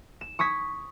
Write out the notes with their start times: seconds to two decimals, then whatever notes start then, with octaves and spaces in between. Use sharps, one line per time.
0.21 E7
0.39 C#6 D#6 G#6 B6